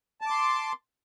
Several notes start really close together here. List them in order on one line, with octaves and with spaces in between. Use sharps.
A5 D6 C6